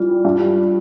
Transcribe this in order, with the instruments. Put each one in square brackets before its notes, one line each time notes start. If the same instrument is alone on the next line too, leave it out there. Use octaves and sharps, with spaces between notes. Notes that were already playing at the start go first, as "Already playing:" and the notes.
Already playing: [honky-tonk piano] E3 G3 [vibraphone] F4
[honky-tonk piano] G2